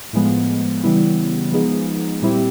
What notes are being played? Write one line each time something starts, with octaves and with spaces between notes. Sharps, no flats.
A2 F3 G#3 B3
C#3 E3 G3 B3 E4
F3 G#3 B3 D#4 G#4
A#2 G3 C4 E4 G4